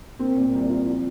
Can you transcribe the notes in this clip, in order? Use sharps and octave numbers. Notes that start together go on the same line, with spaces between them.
A#3 C4
A#2
C2
F4
F3